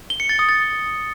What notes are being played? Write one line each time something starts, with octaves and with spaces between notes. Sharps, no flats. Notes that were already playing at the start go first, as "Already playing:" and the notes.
G7
C#7
A6
D#6
A6